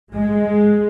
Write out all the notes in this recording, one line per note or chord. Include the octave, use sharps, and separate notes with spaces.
G#3